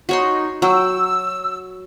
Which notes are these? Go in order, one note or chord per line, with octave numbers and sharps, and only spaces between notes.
D#4 F#4 C#5 C6
F#3 G5 E6